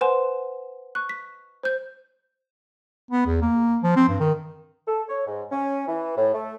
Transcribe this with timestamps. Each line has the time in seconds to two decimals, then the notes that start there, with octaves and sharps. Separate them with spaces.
0.01 B4 C5 F#5 G#5 C6 E7
0.95 C#6 F#6
1.09 B6
1.63 C5 G6
3.11 B3
3.27 E2
3.42 A#3
3.83 F3
3.96 C4
4.09 G2
4.20 D#3
4.88 A4
5.09 C#5
5.27 G#2
5.52 C#4
5.88 E3
6.17 A2
6.34 A3